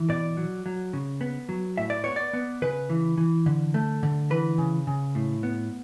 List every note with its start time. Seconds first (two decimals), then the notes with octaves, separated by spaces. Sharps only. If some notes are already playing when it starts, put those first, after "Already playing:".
Already playing: E3
0.09 B2 D5
0.37 F#3
0.66 F#3
0.93 C#3
1.21 B3
1.49 F#3
1.78 A2 E5
1.90 D5
2.04 B3 C#5
2.16 D5
2.33 B3
2.62 C#3 B4
2.90 E3
3.18 E3
3.46 D3
3.74 A3
4.03 D3
4.30 E3 B4
4.58 C#3
4.87 C#3
5.15 A2
5.43 B3